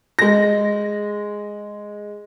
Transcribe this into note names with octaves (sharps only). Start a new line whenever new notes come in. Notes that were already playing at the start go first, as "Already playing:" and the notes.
G#3 A#6